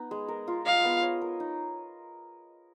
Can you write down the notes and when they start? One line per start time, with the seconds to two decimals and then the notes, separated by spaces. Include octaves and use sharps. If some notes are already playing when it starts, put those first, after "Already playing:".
Already playing: B3 D#4
0.11 G#3
0.28 A#4
0.48 F4
0.66 D#5 F5
0.84 B3
1.02 C#5
1.22 A#4
1.40 D#4